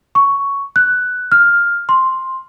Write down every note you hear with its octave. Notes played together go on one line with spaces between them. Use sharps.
C#6
F#6
F6
C6